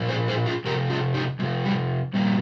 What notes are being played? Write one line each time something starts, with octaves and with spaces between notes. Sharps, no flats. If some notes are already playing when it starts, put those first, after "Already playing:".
Already playing: A#2 F3
G#4 C5
G#4 C5
F4 G#4
C3 F3 G4 A#4
F4 G#4
D#4 G4
C3 F3 G#3
G3
A#2 F3 G3 A#3